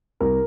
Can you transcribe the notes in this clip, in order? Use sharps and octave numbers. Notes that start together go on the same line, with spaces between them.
C2 A#4